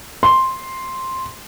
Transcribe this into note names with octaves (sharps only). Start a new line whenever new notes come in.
C6